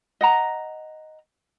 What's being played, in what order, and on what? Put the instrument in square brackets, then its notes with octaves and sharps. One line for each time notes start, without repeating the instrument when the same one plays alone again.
[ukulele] D#5 F#5 A#5